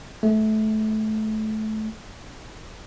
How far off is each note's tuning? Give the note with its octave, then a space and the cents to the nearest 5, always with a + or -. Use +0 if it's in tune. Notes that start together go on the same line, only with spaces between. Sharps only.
A3 -20